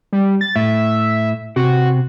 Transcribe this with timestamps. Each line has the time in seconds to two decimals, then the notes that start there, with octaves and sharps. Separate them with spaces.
0.13 G3
0.41 A6
0.56 A2 E5
1.56 C3 F#4